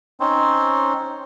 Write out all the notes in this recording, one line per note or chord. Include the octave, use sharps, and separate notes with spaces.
C4 C#4 D#4 C5